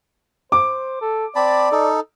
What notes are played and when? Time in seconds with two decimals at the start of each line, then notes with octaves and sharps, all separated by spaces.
0.52 C5 D6
1.01 A4
1.36 C4 D5 A5 B5
1.72 D#4 A4